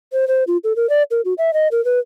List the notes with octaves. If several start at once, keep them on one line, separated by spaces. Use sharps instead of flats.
C5
C5
F4
A4
A#4
D5
A#4
F#4
E5
D#5
A#4
B4